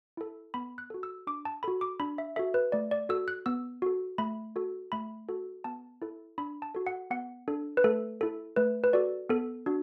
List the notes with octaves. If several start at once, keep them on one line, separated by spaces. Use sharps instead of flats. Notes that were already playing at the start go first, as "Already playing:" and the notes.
E4 A4
B3 B5
F#6
F#4 A4
E6
D4 D6
A5
F#4 A4 B5
D6
D4 B5
E5
F#4 A4 E5
B4
A3 D5
D5
F#4 A4 E6
F#6
B3 E6
F#4 A4
A3 B5
F#4 A4
A3 B5
F#4 A4
B3 A5
E4 A4
D4 B5
A5
F#4 A4
F#5
B3 F#5
D4 A4
B4
A3 A4
E4 A4
A3 B4
B4
F#4 A4 D5
B3 A4
D4 F#4